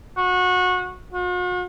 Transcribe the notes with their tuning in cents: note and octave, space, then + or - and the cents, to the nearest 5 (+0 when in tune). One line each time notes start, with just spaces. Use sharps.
F#4 -25
F#4 -45